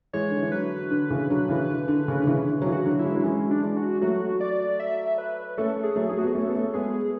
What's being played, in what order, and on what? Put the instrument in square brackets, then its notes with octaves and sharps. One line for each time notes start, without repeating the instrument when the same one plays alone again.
[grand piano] E3 G#3 [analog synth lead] C#5
[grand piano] D3
E3
[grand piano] D3 F#3 [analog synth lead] B4
[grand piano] D3
C#3 E3
D3 F#3
C#3 E3
D3
D3
C#3
D3
C#3 E3
D3
F#3
C#3 E3
[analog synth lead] F#4
[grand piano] D3 F#3
[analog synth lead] E4
[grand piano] E3 G#3
F#3
[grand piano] E3 G#3 [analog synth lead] C#4
[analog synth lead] D4
[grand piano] E3 G#3
[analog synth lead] F#4
[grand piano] F#3 A3 [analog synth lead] F#4
[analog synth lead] D5
E5
B4
[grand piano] A3 C#4 [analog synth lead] A4
[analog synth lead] G#4
[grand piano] F#3 A3
[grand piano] A3 [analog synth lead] G#4
[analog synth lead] F#4
[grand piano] B3 [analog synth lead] G#4
[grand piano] A3 C#4 [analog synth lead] A4
[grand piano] B3
A3 C#4
[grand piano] G#3 B3 [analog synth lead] G#4